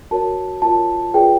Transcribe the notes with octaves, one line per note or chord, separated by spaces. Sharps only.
F#4 A#4 C#5 A5
F4 A#4 C#5 A5
F4 G#4 B4 D5 G5